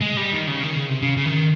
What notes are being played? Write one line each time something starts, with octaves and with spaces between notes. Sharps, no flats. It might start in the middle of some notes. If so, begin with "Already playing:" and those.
G#3
G3
D#3
C#3
D#3
C#3
C3
C#3
C#3
D#3